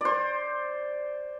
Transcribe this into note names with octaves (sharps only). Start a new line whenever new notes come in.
C5 D5